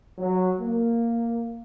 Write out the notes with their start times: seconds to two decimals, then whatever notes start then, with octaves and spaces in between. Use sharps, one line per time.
0.18 F#3
0.59 A#3